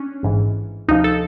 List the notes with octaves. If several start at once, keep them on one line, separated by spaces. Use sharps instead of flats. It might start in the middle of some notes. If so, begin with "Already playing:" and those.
Already playing: C#4 D4
A1 G#2 E3
D2 C3 F3 D#4
A4